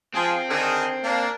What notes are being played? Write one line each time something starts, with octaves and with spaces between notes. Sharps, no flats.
F3 C4 G#4
D3 D#3 G#4
A#3 D4